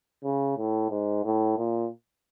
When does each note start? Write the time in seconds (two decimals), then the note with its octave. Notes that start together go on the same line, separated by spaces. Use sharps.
0.24 C#3
0.57 A2
0.90 G#2
1.24 A2
1.58 A#2